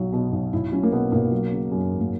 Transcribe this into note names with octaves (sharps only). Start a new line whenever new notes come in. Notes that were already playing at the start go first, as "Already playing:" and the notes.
Already playing: B1 F#3
B2
B1
B1 E4
F#3 C#4
A#3
B2 B3
B1 A#3
F#3
C#3
F#2
G#1
A#3